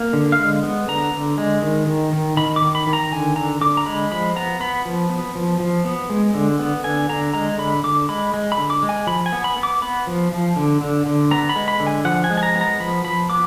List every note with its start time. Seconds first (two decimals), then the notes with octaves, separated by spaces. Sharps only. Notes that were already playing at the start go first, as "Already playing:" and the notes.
Already playing: A#3
0.13 D3
0.32 F5
0.39 G#3
0.63 B3
0.88 D3 A#5
1.13 D3
1.38 G#3
1.62 D#3
1.87 D#3
2.13 D#3
2.37 D#3 B5
2.56 D6
2.62 D#3
2.75 B5
2.87 D#3
2.93 A#5
3.12 D3 G#5
3.36 D3 A#5
3.61 D3 D6
3.77 A#5
3.86 G#3 B5
4.12 F3 B5
4.36 B3 A#5
4.60 B3 B5
4.85 F3
5.10 B3
5.35 F3
5.60 F3
5.85 B3
6.10 G#3
6.34 D3
6.59 B3
6.84 D3 G#5
7.09 D3 A#5
7.34 G#3 A#5
7.58 D3 B5
7.84 D3 D6
8.09 G#3 B5
8.34 G#3
8.52 B5
8.58 D3
8.70 D6
8.83 G#3
8.89 G#5
9.07 F3 B5
9.26 G#5
9.33 B3
9.44 B5
9.57 B3
9.63 D6
9.82 B3 B5
10.07 F3
10.32 F3
10.56 D3
10.81 D3
11.06 D3
11.31 B3 A#5
11.49 B5
11.56 G#3
11.68 B5
11.80 D3
11.87 G#5
12.05 F3 F#5
12.24 G#5
12.30 G#3
12.37 G#5
12.43 A#5
12.55 B3
12.61 A#5
12.80 F3 B5
13.04 F3 B5
13.30 B3 D6